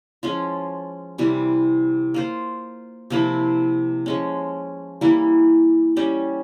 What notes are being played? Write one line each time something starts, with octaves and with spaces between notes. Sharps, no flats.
F3 G#3 C#4 F4
C3 E3 G3
A#3 F4 C5
C3 F3 A#3 E4
F3 G#3 C#4
E3 G3 A#3 E4
G3 C#4 G4